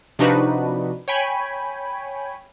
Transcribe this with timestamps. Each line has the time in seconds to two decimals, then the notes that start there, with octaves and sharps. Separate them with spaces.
0.19 C3 F3 D4 D#4 F#4 B4
1.08 C#5 G5 G#5 B5